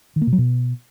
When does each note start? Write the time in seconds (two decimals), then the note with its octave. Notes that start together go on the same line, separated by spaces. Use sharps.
0.16 D#3
0.22 A#3
0.27 B2
0.33 F#3
0.38 B2